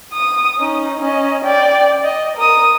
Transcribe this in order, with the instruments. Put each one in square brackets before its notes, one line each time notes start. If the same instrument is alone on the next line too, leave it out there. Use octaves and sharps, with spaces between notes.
[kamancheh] D#6
C#4 D#4
C#4 D#5
D5 G5
D#5
A#4 D#6